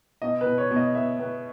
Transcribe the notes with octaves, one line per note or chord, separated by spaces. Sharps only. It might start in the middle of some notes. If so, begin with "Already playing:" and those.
B2 D#5
B2 B4
C#5
B2
D#5
B3 E5
B3